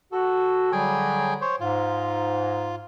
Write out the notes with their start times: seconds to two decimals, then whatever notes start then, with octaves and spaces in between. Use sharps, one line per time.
0.12 F#4 A4
0.72 D3 F#3 G3 G#4 G5 G#5
1.41 C5 C#5
1.60 G#2 F4